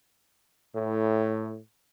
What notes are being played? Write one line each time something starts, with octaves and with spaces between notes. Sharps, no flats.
A2